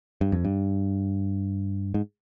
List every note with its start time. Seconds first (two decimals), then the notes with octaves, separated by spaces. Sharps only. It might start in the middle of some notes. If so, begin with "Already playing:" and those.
0.21 G2
0.32 F2
0.45 G2
1.94 G#2